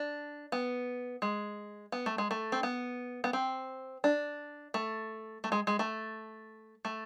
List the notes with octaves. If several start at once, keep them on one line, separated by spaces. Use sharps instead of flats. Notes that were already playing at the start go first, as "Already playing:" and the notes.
Already playing: D4
B3
G#3
B3
A3
G#3
A3
C4
B3
B3
C4
D4
A3
A3
G#3
G#3
A3
A3